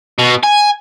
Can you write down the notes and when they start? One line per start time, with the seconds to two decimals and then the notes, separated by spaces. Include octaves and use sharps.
0.18 B2
0.44 G#5